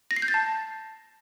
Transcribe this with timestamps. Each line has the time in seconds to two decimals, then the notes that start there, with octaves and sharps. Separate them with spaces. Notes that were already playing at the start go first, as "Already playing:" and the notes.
0.11 A#6
0.16 C7
0.22 G6
0.28 A6
0.34 A5